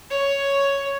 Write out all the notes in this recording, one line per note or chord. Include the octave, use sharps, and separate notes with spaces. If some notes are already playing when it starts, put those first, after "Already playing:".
C#5